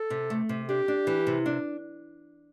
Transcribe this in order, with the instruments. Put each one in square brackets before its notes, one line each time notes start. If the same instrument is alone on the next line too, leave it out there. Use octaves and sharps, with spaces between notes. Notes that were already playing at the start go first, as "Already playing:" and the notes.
Already playing: [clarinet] A4
[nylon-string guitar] C3
A3
C3
[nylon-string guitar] D4 [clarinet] G4
[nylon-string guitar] D4
E3
C3
D4